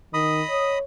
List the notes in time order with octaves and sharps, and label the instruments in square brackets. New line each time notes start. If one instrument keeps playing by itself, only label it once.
[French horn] D#3 [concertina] D#5 B5 D#6
[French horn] C#5